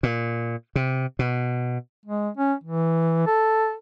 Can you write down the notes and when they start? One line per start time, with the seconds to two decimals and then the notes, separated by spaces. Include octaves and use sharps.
0.03 A#2
0.76 C3
1.19 B2
2.05 G#3
2.37 C#4
2.64 E3
3.27 A4